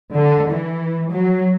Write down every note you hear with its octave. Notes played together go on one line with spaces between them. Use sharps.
D3
E3
F#3